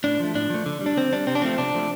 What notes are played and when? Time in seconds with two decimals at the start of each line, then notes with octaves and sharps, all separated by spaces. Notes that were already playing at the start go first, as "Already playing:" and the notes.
0.04 A2 D4
0.20 F3 A3
0.35 A2 D4
0.50 F3 A3
0.66 D3
0.81 G3
0.86 D4
0.97 D3 C4
1.13 G3 D4
1.27 C3 C4
1.35 D4
1.42 F3 A3 C4
1.58 C3 D4
1.74 F3 A3